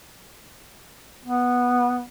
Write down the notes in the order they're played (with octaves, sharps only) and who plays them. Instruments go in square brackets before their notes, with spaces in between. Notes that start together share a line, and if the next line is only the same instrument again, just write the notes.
[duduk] B3